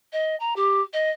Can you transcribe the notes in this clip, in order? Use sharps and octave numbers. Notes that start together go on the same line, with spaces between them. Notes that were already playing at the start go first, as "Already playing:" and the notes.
D#5
A#5
G4
D#5